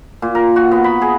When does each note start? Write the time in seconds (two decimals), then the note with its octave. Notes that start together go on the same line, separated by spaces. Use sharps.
0.22 A#2
0.35 A#4
0.56 F#4
0.71 B3
0.84 B5
1.02 G#4